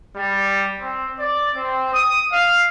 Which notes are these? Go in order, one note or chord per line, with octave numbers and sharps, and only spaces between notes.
G3
C4
D5
C4
D#6
F5